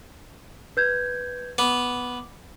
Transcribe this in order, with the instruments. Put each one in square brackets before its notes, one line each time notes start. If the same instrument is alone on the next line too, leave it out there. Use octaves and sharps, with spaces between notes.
[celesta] B4 G6 G#6
[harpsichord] B3 [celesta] D6